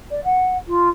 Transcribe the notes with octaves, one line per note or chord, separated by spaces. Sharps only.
D5
F#5
F4